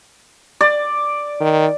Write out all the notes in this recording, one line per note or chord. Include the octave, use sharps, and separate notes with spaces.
D5
D#3